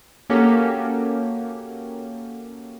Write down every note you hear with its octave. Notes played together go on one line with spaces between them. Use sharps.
A#3 C#4 F#4 G4 A4